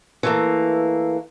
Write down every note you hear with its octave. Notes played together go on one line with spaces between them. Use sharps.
E3 A3 A#3